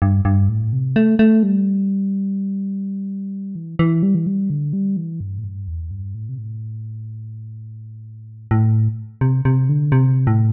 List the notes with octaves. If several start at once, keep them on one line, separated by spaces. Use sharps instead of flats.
G2
G2
A2
C3
A3
A3
G3
E3
E3
G3
E3
G3
D3
G3
E3
G2
A2
G2
E2
G2
A2
C3
A2
A2
C3
C3
D3
C3
A2